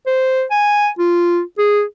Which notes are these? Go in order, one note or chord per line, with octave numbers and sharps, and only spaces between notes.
C5
G#5
F4
G#4